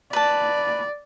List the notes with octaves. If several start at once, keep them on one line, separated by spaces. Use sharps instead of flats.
B4 D5 A5